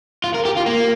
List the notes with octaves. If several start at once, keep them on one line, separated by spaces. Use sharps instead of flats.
F4
A#4
G4
F4
A#3